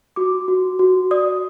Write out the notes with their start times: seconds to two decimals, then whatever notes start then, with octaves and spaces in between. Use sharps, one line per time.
0.16 F#4 D6
0.48 F#4
0.79 F#4
1.11 D5 D#6